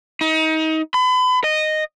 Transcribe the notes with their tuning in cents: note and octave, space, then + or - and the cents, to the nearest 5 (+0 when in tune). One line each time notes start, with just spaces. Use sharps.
D#4 +30
B5 +35
D#5 -10